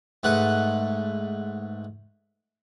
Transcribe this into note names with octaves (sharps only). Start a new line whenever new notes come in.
G#2 A3 B4 F#5